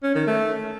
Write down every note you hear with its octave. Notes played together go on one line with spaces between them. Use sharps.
C#4
D#3
A3